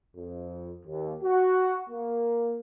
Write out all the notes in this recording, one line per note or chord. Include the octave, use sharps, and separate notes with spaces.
F2
D#2
F#4
A#3